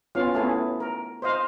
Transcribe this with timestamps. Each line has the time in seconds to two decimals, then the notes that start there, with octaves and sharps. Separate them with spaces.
0.15 B3 C#4 F4 F5
0.34 A3 B3 C#4 E4 G#4 A4
0.80 A#4
1.22 C5 D#5 F5